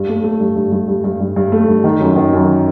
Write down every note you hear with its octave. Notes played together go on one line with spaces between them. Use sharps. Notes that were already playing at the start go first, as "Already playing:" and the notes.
Already playing: G2
A3
A3
G2
G2
G2
G2
G2
G2
G2
A3
G2
D#3
F#2
D#3
F#2